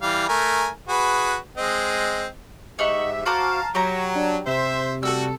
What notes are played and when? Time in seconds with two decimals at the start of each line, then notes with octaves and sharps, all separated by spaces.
0.02 E3 G3 F5
0.29 A3 A#4 G#5
0.89 F#4 G#4 B4
1.57 G#3 C4 D#5
2.79 G#2 D#4 G4 E5 F#5 C#6
3.26 F#4 C5 F5 A5 A#5 D6
3.75 F#3 G4 A#5 C#6
4.15 D4
4.47 C3 C5 E5
5.03 G3 A3 F#4 A4 E6